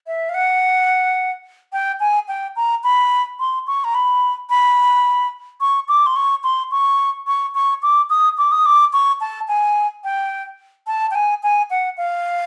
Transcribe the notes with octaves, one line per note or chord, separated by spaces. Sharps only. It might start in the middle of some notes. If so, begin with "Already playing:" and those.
E5
F5
F#5
G5
G#5
G5
A#5
B5
C6
C#6
A#5
B5
B5
C#6
D6
C6
C#6
C6
C#6
C#6
C#6
D6
D#6
D6
D#6
D6
C#6
A5
G#5
G5
A5
G5
G#5
G#5
F#5
F5